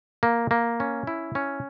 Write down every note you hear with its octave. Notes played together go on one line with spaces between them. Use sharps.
A#3
A#3
C#4
E4
C#4